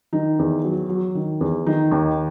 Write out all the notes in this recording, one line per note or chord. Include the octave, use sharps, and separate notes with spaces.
D#3 D#4
E2
F#3
F#3
D#3
E2
D#3 D#4
D#2